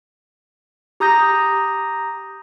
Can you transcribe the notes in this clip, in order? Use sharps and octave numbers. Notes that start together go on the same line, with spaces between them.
G4 A#5 D#6 G6 A#6